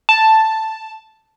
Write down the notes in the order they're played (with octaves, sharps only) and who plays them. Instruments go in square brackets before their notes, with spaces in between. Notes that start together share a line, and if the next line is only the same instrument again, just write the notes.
[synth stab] A5